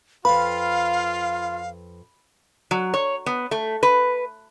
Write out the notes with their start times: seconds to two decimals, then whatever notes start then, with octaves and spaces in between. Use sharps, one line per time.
0.25 F2 F4 B4 F5 B5
2.71 F#3
2.94 C#5
3.26 B3
3.51 A3
3.83 B4